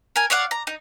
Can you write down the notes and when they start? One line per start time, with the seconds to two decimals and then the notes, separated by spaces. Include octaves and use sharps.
0.16 A#4 G#5
0.30 C#5 D5 F5 F#5
0.51 A#5
0.67 D#4